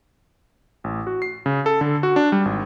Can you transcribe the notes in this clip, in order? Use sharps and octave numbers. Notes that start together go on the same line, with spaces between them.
A1
F#4
C7
C#3
A4
D3
F#4
D4
G3
G#1